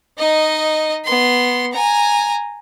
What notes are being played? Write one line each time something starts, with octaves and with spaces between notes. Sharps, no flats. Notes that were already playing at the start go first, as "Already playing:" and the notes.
D#4 D#5
B3 C6
G#5 A#5